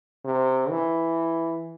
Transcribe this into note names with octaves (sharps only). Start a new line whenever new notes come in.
C3
E3